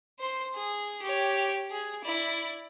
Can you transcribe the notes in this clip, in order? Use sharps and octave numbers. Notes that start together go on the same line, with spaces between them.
C5 C6
G#4
G4 C#5
G#4
E4 D5